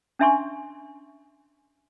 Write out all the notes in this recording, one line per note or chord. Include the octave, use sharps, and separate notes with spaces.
C#4 D4 E5 G#5 C6 C#6